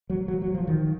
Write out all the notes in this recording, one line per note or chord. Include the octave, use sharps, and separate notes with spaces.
F#3
F#3
F#3
F3
D#3